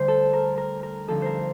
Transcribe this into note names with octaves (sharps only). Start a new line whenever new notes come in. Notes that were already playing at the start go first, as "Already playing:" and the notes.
Already playing: D2 D3 G3 C5
A4
A#4
A#4
A#4
G2 D3 F3 C4 D#4 A4
A#4 C5